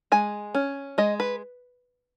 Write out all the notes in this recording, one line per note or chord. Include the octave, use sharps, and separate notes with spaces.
G#3 G#5
C#4
G#3 D#5
B4